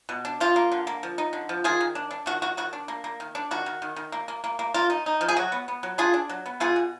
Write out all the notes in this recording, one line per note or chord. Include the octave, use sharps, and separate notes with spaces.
B2
D4
F3 F4
A#3
D3
A#3
F3
D#4
D3
F3
D#3 F4 G#4
D#3
D4
D4
D#3 F#4
D#3 F#4
D#3 F#4
D4
A#3
A#3
D#3
D4
D#3 F#4
D#3
D#3
D#3
A#3
A#3
A#3
A#3
A#3 F4
D#4
D#4
F3
G#4
F#3 F#4
B3
B3
F#3
D4 F4 G#4
D4
F#3
B3
B2 F4 G#4
B2